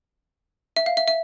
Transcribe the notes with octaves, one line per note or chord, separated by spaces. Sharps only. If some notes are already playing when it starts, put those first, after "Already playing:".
E5
F5
E5
E5